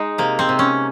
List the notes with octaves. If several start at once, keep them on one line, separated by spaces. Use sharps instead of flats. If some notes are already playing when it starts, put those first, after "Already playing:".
Already playing: G#3 D#4
C3 A#3
C4
C3
C#4